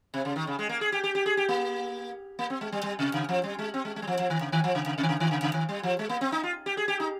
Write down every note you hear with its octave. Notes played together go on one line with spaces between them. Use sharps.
C3
C#3
D#3
C#3
G#3
A#3
G#4
G4
G4
G4
G#4
G4
A#3
A#3
C4
G#3
G3
G3
C3
C#3
F3
G3
G#3
C4
G#3
G#3
G3
F3
F3
D#3
C#3
D#3
F3
C#3
C#3
C3
D#3
C#3
D#3
C#3
C#3
D#3
G3
F3
G#3
A#3
C4
D#4
F4
G4
G#4
G4
D#4